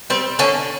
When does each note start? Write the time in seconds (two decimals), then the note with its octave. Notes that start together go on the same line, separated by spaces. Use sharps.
0.10 G3 C4
0.39 D3 C#4